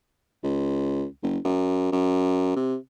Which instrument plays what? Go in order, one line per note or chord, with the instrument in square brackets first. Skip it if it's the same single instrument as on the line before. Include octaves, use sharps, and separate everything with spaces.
[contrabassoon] C#2
F#1
F#2
F#2
C3